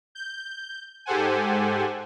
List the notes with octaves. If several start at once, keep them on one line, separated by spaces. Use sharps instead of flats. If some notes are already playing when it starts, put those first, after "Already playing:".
G6
G#2 G4 A4 C5 F#5 G#5